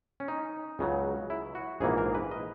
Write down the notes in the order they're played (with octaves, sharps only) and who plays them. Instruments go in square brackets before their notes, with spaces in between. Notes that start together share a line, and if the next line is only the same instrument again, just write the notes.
[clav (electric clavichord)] C#4
D#4
C#2 C#3 F#3
E4
F#4
A#1 G#2 E3 A#3 G#4
A#4
B4
D#5